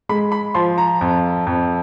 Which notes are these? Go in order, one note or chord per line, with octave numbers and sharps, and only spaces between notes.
G#3 B5
B5
F3 C6
A#5
F2
F2